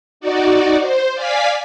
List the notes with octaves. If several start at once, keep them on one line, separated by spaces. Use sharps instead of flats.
D#4 F#4 D5
C5
D5 F5 G#5 B6